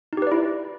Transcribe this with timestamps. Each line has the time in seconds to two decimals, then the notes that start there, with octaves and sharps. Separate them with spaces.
0.13 D#4
0.17 G4
0.22 B4
0.27 D5
0.32 E4